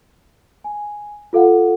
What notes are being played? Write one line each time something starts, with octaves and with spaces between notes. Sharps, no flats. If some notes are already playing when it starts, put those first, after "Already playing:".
G#5
F4 A4 F5 F#5